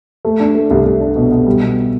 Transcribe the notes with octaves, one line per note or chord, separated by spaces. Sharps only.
A3
D4
A3
C2
C2
D4
B2
B2
G3
B2